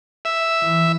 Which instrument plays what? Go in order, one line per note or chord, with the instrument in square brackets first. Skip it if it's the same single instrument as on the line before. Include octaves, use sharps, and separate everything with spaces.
[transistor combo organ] E5
[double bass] E3